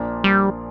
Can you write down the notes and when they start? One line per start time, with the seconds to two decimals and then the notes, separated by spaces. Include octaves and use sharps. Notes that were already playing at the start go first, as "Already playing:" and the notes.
Already playing: A#1 A#2 F3 A#3 D4
0.24 G3